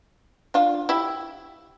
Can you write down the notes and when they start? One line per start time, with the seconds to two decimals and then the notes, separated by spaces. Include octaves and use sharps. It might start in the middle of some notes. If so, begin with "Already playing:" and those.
0.54 D4 F4
0.89 E4 G4